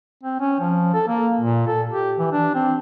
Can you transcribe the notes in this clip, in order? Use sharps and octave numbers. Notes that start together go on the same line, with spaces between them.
C4
C#4
F3
A4
A#3
A#2
A4
G4
E3
D4
C4